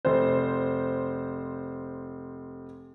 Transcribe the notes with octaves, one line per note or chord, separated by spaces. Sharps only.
F1 C5